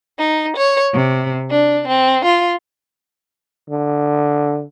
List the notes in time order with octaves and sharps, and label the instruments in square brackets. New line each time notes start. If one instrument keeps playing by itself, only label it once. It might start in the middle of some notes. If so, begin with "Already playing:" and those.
[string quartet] D#4
C#5
C3
D4
C4
F4
[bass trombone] D3